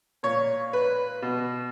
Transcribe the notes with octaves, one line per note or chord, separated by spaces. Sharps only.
A#2 C#5
B4
B2